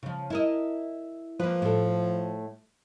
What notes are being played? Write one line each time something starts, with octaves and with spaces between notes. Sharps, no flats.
C#3 F3
E4 A#4 D#5
F3 A#3 B4
A2 A4